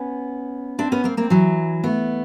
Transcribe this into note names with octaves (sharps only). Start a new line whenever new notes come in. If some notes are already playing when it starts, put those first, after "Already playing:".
Already playing: B3 C#4
C4 D4
B3 C#4
A#3 C4
A#3 C4
E3 F#3
A3 B3